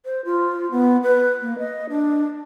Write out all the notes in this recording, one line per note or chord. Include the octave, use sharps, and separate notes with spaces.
C5
F4
B3
B4
A#3
D#5
D4